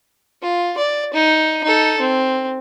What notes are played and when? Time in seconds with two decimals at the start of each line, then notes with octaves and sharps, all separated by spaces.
0.42 F4
0.78 D5
1.13 D#4
1.64 D#4 A4
2.00 C4